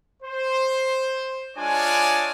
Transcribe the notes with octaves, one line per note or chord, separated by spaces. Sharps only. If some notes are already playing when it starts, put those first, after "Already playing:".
C5
G#3 D4 F4 C#5 D5 G#5